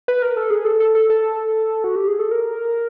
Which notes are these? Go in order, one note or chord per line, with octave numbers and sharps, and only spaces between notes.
B4
A#4
A4
G#4
A4
A4
A4
A4
F#4
G4
G#4
A4
A#4